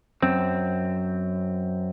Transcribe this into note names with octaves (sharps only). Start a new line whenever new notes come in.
F#2 C4